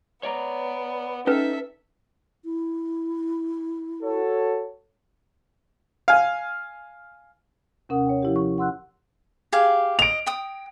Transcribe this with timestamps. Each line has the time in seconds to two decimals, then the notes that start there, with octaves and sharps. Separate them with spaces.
0.23 B3 C#5 D5 A#5
1.27 C#4 D#4 A4 B4 E5
2.45 E4
4.03 F#4 A4 C#5
6.08 F5 G#5
7.89 D#2 C3 C#4 A#4 F#5 D#6
8.06 C#5 G5
8.22 F3 E4 G4
8.36 C#6
8.58 F#5 C6 E6 F#6
9.52 G4 G#4 F5
9.99 D#5 D7 F7
10.26 G5 D#6